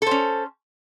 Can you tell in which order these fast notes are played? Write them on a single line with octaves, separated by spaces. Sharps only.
A4 C5 C#4